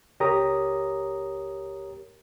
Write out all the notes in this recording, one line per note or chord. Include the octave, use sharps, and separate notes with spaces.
C#2 G4 A#4 C#5 A#5 D#6